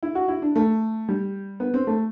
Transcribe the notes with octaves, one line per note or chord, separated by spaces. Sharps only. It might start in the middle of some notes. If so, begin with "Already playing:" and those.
E4
F#4
E4
D4
A3
G3
B3
C4
A3